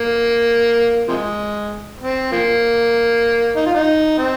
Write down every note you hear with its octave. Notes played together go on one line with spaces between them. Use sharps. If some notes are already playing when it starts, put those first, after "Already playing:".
Already playing: A#3
C3 F3 G#3
C4
F3 A#3
D#4
F4
D#4
C4